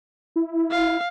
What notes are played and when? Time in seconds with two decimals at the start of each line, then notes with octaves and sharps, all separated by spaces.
0.36 E4
0.71 F5